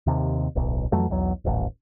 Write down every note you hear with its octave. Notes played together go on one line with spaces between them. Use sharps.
D#2 C3
D1 B1
F2 E3 F#3 A3
B1 E2 F#3
D#1 A1